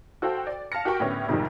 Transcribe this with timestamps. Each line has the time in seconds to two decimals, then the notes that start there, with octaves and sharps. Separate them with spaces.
0.22 F#4 A4 C5 F5 G5
0.47 D5
0.72 F5 A5 F6 A#6 C#7
0.85 F#4 G4 A#4 G5 C#6
1.00 A2 D3 B3 C#4 G4
1.28 F2 G#2 C3 D#3 F3 G3